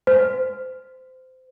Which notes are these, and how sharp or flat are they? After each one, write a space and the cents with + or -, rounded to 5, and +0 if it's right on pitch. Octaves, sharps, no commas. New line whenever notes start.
C5 -20